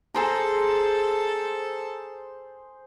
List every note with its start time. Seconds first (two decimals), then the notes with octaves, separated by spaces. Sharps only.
0.14 G#4 A4 C5 A#5